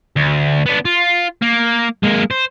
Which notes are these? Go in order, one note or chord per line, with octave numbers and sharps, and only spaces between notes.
D2
B3 D4
F4
A#3
G#3 A#3
C5